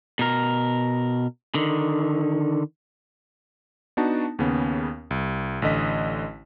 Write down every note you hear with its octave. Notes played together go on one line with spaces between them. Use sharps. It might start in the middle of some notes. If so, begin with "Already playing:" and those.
B2 A#4
D3 D#3
B3 D4 D#4 F#4 A5
D#2 C#3 B3 C#4
C2
A1 D3 D#5 B6